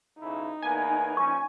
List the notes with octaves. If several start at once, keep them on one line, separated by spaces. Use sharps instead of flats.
B1 C#3 D#4 E4
E2 A#3 B3 G#5
A#2 F3 C#4 C#6